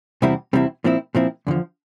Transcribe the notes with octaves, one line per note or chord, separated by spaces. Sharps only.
E2 C3 G3 C4 E4
E2 C3 G3 C4 E4
A#2 F3 C4 E4
A#2 F3 C4 E4
E2 D3 F3